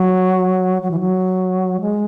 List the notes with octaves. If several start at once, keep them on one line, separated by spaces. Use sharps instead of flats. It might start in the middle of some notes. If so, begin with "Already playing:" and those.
Already playing: F#3
F#3
E3
F#3
G#3